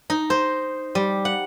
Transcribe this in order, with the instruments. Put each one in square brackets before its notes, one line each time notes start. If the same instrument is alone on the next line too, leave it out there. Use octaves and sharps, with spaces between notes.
[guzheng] D#4
C5
G3
F#5